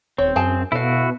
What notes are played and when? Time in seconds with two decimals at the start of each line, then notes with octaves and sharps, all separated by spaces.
0.18 D#1 C4 C#5
0.36 F#2 G#4 G5 A5
0.72 B2 E4 F#4 A4 F5